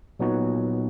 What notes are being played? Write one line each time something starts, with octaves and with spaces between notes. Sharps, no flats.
A#2 F#3 B3 D#4 F#4